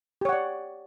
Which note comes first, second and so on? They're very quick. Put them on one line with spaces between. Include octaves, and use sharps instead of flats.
G4 C#5 F#5 D5